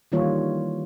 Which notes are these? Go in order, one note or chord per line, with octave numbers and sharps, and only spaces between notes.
D#3 E3 G3 A#3 F4 C#5